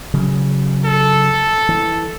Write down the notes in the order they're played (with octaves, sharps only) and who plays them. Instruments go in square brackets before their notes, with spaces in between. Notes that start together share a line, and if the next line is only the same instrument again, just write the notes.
[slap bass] C#3 F#3
[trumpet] A4
[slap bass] E3